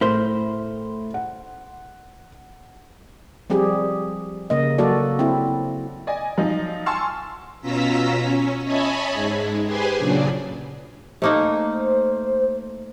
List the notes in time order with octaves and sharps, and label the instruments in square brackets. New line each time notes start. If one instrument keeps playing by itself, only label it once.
[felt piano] A2 [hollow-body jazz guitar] E4 A#4 C5
[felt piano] F#5
[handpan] F3 G3 C4 G4 G#4
C#3 A#3 D#5
F#3 A#3 F#4 A4 D5
C4 E4
[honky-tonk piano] D5 D#5 G#5
F3 F#3 D#4
G#5 A5 C6 C#6 E6 F6
[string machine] B2 C#4 F4 A#5 E6 B6
C#4
C#5 D#5 E5 G#5 A5 B5
G#2 G#3
G4 G#4 B4 C5 G#5 C6
A#2 C#3 F#3 D4
[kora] A3 A#3 D#4 [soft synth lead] C5